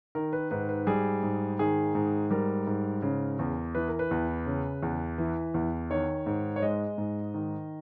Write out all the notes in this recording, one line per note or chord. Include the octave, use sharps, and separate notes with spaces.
D#3 A#4
B4
G#2 B4
B4
G3 G#4
G#2
D#3 G#4
G#2
G3 A#4
G#2
C#3
E2
E3 B4
A#4
B4
E2
C#3
E2
E3
E2
D#3 C#5
G#2
C#5
G#3 D#5
G#2
D#3